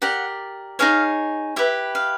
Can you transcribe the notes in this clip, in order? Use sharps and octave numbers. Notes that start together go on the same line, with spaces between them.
G4 A#4 D5 F#5
D#4 G#4 C#5 F5
E4 G4 B4 E5
F5